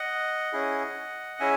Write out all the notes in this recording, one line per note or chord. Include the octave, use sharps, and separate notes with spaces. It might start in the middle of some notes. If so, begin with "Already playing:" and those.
Already playing: D#5 F#5
C#4 E4 G#4
C#4 E4 G#4 E5 G#5